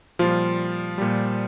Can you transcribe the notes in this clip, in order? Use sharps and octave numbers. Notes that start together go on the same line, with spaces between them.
A#2 F3 G3 F4
A#2 G3